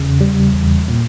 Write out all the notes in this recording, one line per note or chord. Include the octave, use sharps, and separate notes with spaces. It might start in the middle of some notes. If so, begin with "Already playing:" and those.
Already playing: E2 C#3
G3
E2
A#2